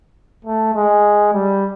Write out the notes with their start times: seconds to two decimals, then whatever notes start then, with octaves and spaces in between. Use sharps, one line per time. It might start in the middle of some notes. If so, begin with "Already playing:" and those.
0.45 A3
0.75 G#3
1.33 G3